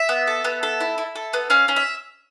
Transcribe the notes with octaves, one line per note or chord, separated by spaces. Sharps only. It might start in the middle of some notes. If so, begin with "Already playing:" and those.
Already playing: E5
B3
A4
B3
A4
E4
E4
A4
B3
C#4 F5
C#4
E5